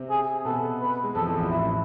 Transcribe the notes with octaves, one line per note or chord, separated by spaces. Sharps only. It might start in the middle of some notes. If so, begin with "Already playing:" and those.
Already playing: C3 C4
G#4
B2 B3 A4
B4
G#3
F2 F3 A4
E2 E3
A1 A2
E4